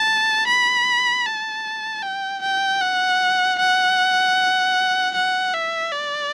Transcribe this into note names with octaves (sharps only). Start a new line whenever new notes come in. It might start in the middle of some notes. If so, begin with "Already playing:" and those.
Already playing: A5
B5
A5
G5
G5
F#5
F#5
F#5
E5
D5